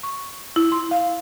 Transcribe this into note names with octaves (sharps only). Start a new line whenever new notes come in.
C#6
E4
C6
F5